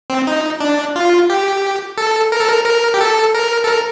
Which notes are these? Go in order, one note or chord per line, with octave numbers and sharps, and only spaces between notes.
C4
D#4
D4
F4
G4
A4
A#4
A4
A#4
A#4
G4
A4
A#4
A4
A#4